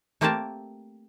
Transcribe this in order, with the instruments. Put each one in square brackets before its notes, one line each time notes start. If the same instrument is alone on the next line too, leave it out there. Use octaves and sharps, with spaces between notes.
[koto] A3 A#3 C4 G4 A#4 A5